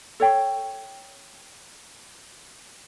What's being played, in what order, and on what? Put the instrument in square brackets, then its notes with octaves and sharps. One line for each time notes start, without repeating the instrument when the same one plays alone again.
[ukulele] A4 C#5 G5